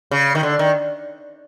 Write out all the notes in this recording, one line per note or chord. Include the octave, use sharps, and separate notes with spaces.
C#3
D#3
D3
D#3